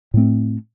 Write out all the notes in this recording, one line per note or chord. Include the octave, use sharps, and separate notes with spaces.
A2 A3 C4